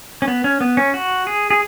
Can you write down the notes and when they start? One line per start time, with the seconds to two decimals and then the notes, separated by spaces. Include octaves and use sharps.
0.22 C#4
0.28 B3
0.44 C#4
0.61 B3
0.77 C#4
0.94 F#4
1.27 G#4
1.50 G#4